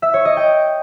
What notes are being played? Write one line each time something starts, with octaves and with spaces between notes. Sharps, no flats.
E5
C#5
D#5
G5